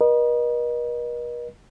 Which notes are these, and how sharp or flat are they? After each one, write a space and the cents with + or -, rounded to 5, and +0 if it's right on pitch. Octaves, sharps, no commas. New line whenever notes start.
A#4 +45 D#5 -25